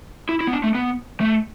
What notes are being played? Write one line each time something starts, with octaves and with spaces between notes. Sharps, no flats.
E4
E4
B3
D4
A3
B3
A3